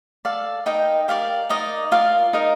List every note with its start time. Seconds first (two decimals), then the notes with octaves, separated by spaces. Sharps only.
0.25 A4 D5 F5
0.66 D#4 A#4 D#5 G5
1.08 G4 A#4 D5 F5
1.49 D#4 A#4 D5 D#5
1.92 F4 A#4 D5 F5
2.33 D#4 A#4 D#5